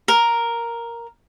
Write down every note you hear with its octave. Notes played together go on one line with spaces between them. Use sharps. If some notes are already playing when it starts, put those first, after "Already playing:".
A#4